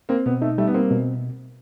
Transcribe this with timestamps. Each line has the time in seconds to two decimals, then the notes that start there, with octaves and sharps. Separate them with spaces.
0.09 A#3 C4
0.26 B2 B3
0.42 A3 D#4
0.58 G3 A3
0.67 B3
0.74 A#3 C4
0.91 B2